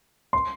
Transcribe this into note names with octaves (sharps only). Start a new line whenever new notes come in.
C6